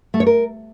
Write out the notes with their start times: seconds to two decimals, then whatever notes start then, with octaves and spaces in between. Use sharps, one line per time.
0.14 A3
0.20 C#5
0.27 A#4